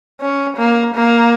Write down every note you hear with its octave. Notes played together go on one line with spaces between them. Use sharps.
C#4
A#3
A#3